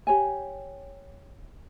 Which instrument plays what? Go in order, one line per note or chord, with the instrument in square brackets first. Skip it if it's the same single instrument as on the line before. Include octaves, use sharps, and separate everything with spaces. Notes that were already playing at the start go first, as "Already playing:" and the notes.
[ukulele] G4 C#5 G#5